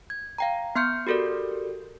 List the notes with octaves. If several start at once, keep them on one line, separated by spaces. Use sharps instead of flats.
G#6
F5 G5 A#5
B3 C6 F6 G6 C#7
F#4 G4 A4 A#4 D5